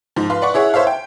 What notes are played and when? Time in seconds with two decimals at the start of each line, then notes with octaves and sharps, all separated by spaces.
0.16 G#2 F3
0.30 B4 F5 C6
0.42 B4 D5 F#5 C#6
0.54 E4 G#4 C#5 E5 F#5
0.74 C5 C#5 E5 F5
0.87 G5